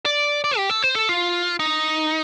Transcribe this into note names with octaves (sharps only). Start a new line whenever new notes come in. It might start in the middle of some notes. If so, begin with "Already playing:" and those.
D5
D5
G4
A4
C5
A4
F4
D#4